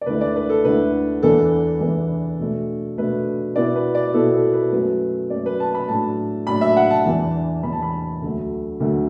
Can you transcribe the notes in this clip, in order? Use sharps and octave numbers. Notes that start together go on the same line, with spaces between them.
D5
D2 D3 A3 E4 B4
D5
B4
A4
D2 D3 A3 E4 B4
E2 E3 B3 D4 A4
E2 E3 B3 D4
B2 A3 D4
B2 A3 D4 B4
B2 B3 E4 D5
B4
D5
B2 B3 E4 A4
A4
B4
F#2 F#3 A3 B4
F#2 F#3 A3 D5
B4
A5
B5
A2 F#3 D4 A5
A2 F#3 D4 B5
E5
F#5
A5
E2 E3 D4
E2 E3 D4 B5
A5
B5
D2 D3 F#3 A3
D2 D3 F#3 A3